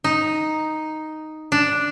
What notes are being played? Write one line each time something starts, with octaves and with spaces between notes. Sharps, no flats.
D#4
D4